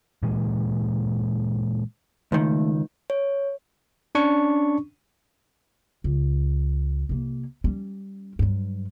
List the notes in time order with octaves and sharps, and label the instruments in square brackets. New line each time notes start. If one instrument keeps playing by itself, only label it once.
[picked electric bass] A#2 E3 G#3
[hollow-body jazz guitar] C#2 D#3 [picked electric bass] A3
[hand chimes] C#5
[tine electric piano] C#4 D4 C#6
[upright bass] C#2
C2 A#3
G3 C#4
G2 F#3